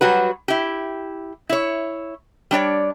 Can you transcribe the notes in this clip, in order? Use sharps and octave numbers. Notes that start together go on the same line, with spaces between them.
F#3 G3 F#4 B4
E4 G4
E4 C#5
G3 D4 C#5 D5